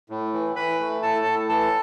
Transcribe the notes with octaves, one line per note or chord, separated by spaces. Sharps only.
A2
E3
E3 B4 B5
A3
A2 A4 A5
A2
E3 A4 A5